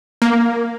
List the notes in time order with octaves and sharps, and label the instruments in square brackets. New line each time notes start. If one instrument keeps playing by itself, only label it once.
[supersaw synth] A#3